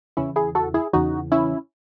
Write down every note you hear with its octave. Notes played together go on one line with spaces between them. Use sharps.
E2 C#3 E3 C#4 E4
E4 G#4
F#4 A4
E4 G#4
E2 C#3 E3 D#4 F#4
C#4 E4